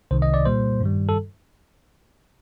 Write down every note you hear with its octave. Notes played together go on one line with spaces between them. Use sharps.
C2 C3 D#3 C5
D#5
D5
A#2 G3 A#3 C5
G2 D#3 G3
A4